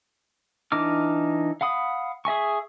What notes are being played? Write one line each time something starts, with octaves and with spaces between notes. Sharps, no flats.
E3 D4 D#4 D6 F6
F5 F#5 B5 D#6
G#4 E5 G#5 C#6